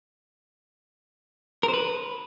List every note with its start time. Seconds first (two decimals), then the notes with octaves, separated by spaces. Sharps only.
1.63 A#4
1.68 C5
1.74 B4